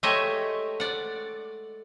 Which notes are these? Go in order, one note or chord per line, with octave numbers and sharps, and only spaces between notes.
G#3 A3 G4 C#5 D#5 E5
D5 F#5